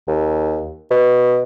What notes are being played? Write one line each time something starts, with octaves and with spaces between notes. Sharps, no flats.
D#2
B2